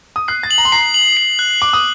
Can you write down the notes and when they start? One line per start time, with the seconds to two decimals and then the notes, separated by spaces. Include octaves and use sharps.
0.16 D#6
0.28 F#6 C7
0.43 A6
0.51 F#7
0.58 A#5
0.65 C6
0.72 A#5 C7
0.94 F#7
1.17 C7
1.39 F#6
1.61 D6 C7
1.73 D#6